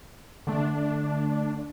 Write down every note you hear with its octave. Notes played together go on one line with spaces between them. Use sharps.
D3 A3 D4